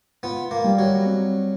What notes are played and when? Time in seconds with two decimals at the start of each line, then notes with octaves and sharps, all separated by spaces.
0.23 B3 F4
0.51 A#3
0.64 G3
0.79 F#3
1.06 C4